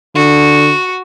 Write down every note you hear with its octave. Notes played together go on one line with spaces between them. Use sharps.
D3 F#4